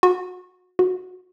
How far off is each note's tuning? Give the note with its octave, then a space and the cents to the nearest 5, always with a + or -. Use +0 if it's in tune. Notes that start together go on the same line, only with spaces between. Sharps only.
F#4 -25
F#4 -15